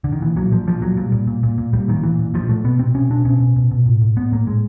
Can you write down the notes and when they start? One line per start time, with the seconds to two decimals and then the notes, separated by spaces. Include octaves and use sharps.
0.04 D3
0.12 D#3
0.22 A#2 E3
0.36 A#2 F#3
0.51 A#2 F3
0.67 A#2 F3
0.82 A#2 F#3
0.97 A#2 G3
1.12 A#2
1.27 A#2
1.43 A#2
1.58 A#2
1.73 A#2 G3
1.88 A#2 D#3
2.03 A#2 E3
2.19 A#2
2.34 A#2 F3
2.49 A#2 A3
2.64 B2 B3
2.79 B2 C4
2.94 B2 C#4
3.10 B2 D4
3.25 B2 C#4
3.40 B2
3.56 B2
3.71 B2
3.86 A2
4.01 A2
4.16 A2 B3
4.32 A2 A#3
4.47 A2 G#3